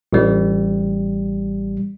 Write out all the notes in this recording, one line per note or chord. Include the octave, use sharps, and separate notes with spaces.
A1 G3